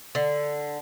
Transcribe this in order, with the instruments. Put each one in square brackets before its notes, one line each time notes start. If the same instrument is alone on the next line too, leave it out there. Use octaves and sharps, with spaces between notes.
[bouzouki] D3